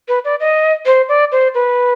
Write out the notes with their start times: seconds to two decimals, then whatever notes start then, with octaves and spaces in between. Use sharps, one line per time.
0.08 B4
0.25 D5
0.40 D#5
0.86 C5
1.09 D5
1.32 C5
1.55 B4